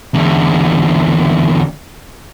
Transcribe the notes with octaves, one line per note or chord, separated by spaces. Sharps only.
E2 D3